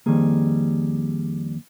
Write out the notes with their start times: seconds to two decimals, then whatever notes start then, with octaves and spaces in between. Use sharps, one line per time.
0.06 F2 C3 D#3 G3 A#3 G#4